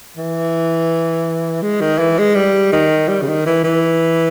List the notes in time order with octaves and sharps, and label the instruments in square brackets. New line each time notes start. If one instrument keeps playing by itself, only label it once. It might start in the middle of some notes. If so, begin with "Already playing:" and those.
[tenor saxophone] E3
G#3
D#3
E3
G#3
G3
D#3
G3
C#3
D#3
E3
E3